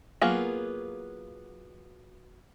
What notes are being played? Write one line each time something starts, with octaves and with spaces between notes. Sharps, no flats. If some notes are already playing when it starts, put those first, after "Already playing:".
F#3 A#3 B3 F4 G#4